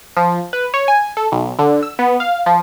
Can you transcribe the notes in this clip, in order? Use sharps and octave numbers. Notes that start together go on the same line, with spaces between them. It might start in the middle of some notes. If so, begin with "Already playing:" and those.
F3
B4
C#5
G#5
A4
B1
D3
E6
B3
F5
F3